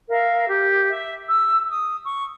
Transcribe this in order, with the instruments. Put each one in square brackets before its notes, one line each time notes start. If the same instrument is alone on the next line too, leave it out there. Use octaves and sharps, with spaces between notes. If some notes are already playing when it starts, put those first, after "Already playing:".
[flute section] A#4 E5 F5
G4
E5
E6
D#6
C#6